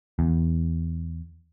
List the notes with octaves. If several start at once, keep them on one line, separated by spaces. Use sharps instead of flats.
E2